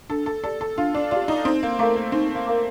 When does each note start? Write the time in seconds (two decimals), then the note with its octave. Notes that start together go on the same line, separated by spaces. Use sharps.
0.10 D4 A4
0.26 A4
0.43 G4 A4 D5
0.61 A4
0.78 D4 F4
0.94 D4
1.11 F4 G4 D5
1.28 D#4
1.45 C4 D#4
1.63 A#3
1.79 A3 A#4 F5 A#5 D6
1.96 A#3
2.12 C4 D#4
2.35 A#3
2.46 A#4 F5 A#5 D6